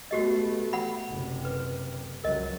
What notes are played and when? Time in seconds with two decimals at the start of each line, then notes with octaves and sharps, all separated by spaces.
0.11 A3 B3 F#4 G4 D#5
0.73 F#5 B5
1.10 F#1 C3
1.45 B4
2.24 C#2 F#3 A#4 D#5